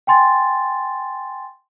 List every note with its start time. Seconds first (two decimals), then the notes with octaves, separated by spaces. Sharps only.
0.07 G5 G#5 C6 A6